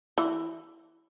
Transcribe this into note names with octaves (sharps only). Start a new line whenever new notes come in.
E3